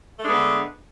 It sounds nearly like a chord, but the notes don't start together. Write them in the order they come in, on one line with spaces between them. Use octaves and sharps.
A3 D4 G#3 B3 D3